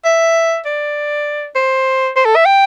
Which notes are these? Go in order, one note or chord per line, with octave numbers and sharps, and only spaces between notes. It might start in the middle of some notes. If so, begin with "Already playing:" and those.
E5
D5
C5
C5
A4
E5
G5